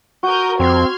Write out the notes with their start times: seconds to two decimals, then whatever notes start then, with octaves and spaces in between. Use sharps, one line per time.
0.23 F#4 A#4 D#6 G6
0.60 F2 C4 C6 F6 G#6